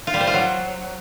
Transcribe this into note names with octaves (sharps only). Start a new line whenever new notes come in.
F4
G3
C5
F4
F#3